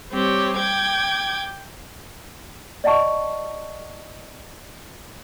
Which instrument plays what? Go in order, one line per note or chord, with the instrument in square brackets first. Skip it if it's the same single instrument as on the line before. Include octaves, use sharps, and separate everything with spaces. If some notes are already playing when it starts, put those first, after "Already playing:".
[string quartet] G3 C4 G4 C#5
G5 D6 G#6
[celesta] D5 D#5 F#5 A5 C#6